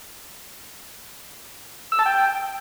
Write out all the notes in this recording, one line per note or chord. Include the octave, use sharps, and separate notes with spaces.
E6
A5
G5